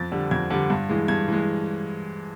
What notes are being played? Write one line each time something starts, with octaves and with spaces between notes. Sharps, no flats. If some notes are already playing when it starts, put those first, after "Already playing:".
Already playing: F2 A6
D3 G3
F2 G#6
D3 G3
G2
E3 G#3
G2 G#6
E3 G#3